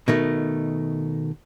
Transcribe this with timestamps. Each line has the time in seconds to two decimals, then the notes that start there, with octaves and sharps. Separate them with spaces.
0.08 B2 D#3 A3